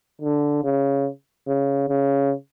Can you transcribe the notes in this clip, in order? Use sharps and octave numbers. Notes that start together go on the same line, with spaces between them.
D3
C#3
C#3
C#3